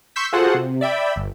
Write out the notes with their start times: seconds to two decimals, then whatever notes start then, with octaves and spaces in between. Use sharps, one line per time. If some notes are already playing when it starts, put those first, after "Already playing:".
0.16 C6 C#6 E6 G6 B6
0.33 F4 F#4 G#4 A4 C5 F#5
0.54 C3
0.81 D5 E5 G5 B5
1.16 G1